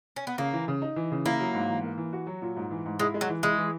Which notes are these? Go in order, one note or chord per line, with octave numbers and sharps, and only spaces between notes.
C#4
B3
C#3 A#3
E3
C#3
D#4
E3
C#3
A#3 E4
F#3
G#2
E3
A#3
E3
F#4
F#3
A#2
G#2
E3
G#2
G#3 E4
G#3
F#3
E3
G#3 E4
E3